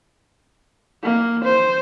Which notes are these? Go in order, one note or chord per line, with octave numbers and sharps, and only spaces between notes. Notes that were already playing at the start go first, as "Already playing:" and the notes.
A#3
C5